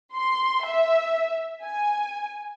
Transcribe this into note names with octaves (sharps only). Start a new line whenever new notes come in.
C6
E5
G#5